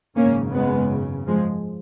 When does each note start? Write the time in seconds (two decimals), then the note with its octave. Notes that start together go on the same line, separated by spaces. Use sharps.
0.16 G#1 F#2 C#3 A#3 C#4
0.53 G#3 B3
1.26 F3 G#3